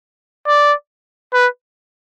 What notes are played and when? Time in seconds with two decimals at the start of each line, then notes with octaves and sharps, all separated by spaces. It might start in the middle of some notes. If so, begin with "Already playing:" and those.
0.47 D5
1.34 B4